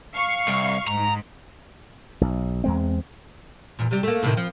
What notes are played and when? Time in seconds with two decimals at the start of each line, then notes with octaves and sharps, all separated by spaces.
0.14 F5 C#6
0.48 C2
0.88 G#2 A#5
2.21 B1
2.64 E2 G#3 C4
3.79 E2 A#2
3.91 C3 G3
4.03 A3 A#3
4.23 A2 C3 D#3
4.37 F3